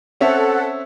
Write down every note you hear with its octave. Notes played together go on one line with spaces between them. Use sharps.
C4 C#4 A4 E5 F#5